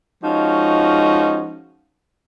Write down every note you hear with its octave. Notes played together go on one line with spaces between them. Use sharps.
F3 G#3 C#4 D#4 F#4